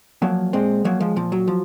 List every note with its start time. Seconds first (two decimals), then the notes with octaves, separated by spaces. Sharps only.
0.22 F3 F#3 A#3
0.53 A#2 G#3 C4
0.84 F3 F#3 A#3
1.00 F3 G#3
1.16 A#2 F3
1.32 F#3
1.48 F3